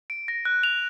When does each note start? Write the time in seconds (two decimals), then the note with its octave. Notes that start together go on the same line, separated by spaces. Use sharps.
0.10 D7
0.28 A#6
0.45 F#6
0.63 F7